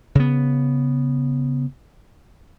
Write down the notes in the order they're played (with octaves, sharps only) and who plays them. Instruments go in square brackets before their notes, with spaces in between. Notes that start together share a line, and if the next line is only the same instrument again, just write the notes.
[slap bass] C#3 B3